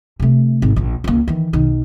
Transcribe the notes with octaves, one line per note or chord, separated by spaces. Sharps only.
C3 A3
G#1
A#1 A#2
C#2 A#3
D#3 E3
B1 D#3